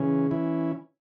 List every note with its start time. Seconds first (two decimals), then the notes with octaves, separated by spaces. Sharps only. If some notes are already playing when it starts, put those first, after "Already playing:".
Already playing: C#3 E3 C#4
0.31 E3 C#4 E4